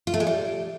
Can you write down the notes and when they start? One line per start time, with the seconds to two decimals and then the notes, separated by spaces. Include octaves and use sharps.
0.07 F4
0.14 A3
0.20 G#3
0.27 G3